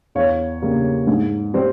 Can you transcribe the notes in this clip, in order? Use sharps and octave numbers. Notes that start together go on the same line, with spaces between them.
E2 C#5 F5
C#3 G3 A#3
G#2
G3 C4